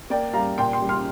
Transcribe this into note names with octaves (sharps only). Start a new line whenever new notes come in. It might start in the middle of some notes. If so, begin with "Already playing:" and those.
A#3 D5 G5
G3 F5 A#5
A#2 G5 C6
G5 C6
G3
C6 F6